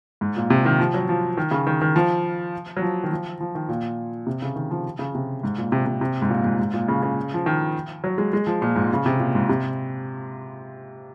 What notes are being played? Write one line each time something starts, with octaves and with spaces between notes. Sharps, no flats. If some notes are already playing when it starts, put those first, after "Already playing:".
G#2
A#2
C3
D#3
F3
F#3
F3
D#3
C#3
D#3
D#3
F3
F#3
F3
D#3
F3
F3
D#3
A#2
C3
C#3
D#3
F3
C#3
C3
G#2
A#2
C3
C3
C3
G#2
A#2
G#2
G#2
A#2
C#3
C#3
F3
D#3
F#3
G#3
G#3
F3
A#2
G#2
C#3
C3
A#2
G#2
C3